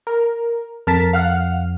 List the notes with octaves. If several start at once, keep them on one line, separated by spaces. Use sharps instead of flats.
A#4
F2 A#4 A5 B6
F5 F#5 F6